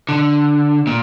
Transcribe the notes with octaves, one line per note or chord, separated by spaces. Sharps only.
D3
A#2